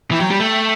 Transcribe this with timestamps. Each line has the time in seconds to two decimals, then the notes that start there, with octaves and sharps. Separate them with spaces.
0.11 E3 G5
0.21 F#3
0.31 G3
0.40 A3 G5